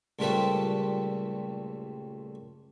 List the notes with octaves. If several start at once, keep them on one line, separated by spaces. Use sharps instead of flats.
C#2 A#2 G3 A3 B4 C5